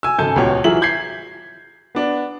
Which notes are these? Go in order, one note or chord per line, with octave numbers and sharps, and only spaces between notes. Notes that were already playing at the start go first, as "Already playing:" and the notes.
G#5 E6
G#1 C#3 A4 G#5 A5 G6
D#1 C#2 B2 G4 C#5
E3 F#3 F4 G#4 E5 F#7
G6 G#6 B6 C7
B3 D4